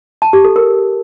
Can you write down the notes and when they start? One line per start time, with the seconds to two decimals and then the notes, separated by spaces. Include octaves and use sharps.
0.22 A5
0.33 G4
0.45 A4
0.56 A#4